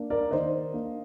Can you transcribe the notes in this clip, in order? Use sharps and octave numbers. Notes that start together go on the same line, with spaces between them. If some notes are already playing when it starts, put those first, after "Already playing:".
Already playing: A#3 D4
A#4 D5
D#3 C5 D#5
A#3 D4